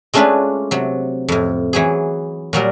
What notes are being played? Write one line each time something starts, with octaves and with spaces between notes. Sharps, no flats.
G#3 A3 C#4 D4 F4 B4
C3 F#3
F2 A2
E3 F#3 G#4
A#2 F#3 G3 A#4